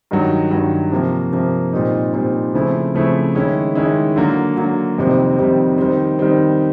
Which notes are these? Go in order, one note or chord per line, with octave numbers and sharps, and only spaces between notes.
G2 D#3 F#3
G2 D#3 F#3
C3 F3 A#3
C3 F3 A#3
A#2 G3 C4 D#4
A#2 G3 C4 D#4
C#3 F3 A3 C4 E4
C#3 F3 A3 C4 E4
D#3 G#3 C#4 E4
D#3 G#3 C#4 E4
D3 F#3 A#3
D3 F#3 A#3
F2 C3 D#3 G3 C4
F2 C3 D#3 G3 C4
D#3 G3 C4
D#3 G3 C4